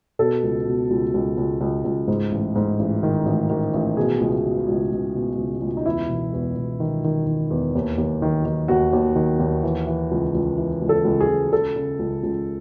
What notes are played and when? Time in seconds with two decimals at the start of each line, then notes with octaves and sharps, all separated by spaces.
0.19 B2 A4
0.43 C#2
0.66 B2
0.91 C#2
1.14 C#2
1.38 C#2
1.61 C#2
1.84 C#2
2.08 G#2
2.32 A1
2.56 G#2
2.79 A1
3.03 D#3
3.26 A1
3.50 D#3
3.74 A1
3.97 B2 G#4
4.20 C#2
4.44 B2
4.68 C#2
4.92 C#2
5.15 B2
5.38 C#2
5.62 C#2
5.77 D#4
5.85 E2 E4
6.10 E1
6.33 E2
6.56 E1
6.80 D#3
7.04 D#3
7.27 D#3
7.51 E2
7.75 D#2
7.98 D#2
8.22 D#3
8.45 D#3
8.68 D#2 F#4
8.93 D#2
9.16 D#3
9.40 D#2
9.63 E3
9.87 E3
10.11 C#2
10.35 C#2
10.58 E3
10.82 C#2
10.89 A4
11.05 C#2
11.21 G#4
11.28 C#2
11.52 C#3 A4
11.76 C#3
11.99 C#2
12.23 C#2